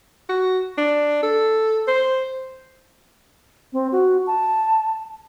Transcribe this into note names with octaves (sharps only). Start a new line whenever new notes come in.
F#4
D4
A4
C5
C4
F#4
A5